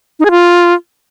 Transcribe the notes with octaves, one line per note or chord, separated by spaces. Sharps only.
D#4
G#4
F4